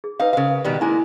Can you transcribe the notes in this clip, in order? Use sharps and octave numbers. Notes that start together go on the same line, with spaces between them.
G#4
D#4 B4 C#5 F5
C#3 A#4 C5 F5
B2 D#3 G3
G#3 A#3 E4 G#5